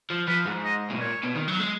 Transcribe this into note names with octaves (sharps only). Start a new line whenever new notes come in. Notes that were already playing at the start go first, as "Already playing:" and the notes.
F3
F3 B4
G#2
D#5
B2
A#2 C#5
B2
D#3
F#3
G#3